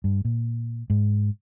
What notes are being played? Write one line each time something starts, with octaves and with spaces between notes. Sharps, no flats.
G2
A#2
G#2